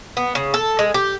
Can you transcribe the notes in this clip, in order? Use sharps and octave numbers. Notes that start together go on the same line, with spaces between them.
B3
C#3
A4
G#3
G4